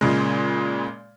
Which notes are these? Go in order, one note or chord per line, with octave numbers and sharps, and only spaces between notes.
A#2 C#3 G#3